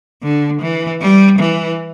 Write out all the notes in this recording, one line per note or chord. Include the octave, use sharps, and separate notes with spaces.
D3
E3
G3
E3